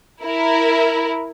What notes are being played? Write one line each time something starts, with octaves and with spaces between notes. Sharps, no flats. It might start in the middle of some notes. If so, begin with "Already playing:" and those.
E4 A#4